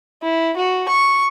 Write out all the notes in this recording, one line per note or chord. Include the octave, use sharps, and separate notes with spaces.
E4
F#4
C#6